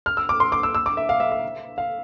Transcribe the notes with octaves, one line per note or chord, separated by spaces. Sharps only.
F6
E6
D6
C6
D6
E6
E6
D6
E5
F5
E5
E5
F5